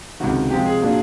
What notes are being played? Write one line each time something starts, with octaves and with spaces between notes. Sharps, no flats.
C#2 C3 D#3 F#4
C3 F3 G#3 C4 G4
G#4
A#2 F#3 A#3 D4